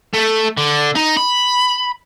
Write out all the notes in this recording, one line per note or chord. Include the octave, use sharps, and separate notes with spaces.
A3
D3
D#4
B5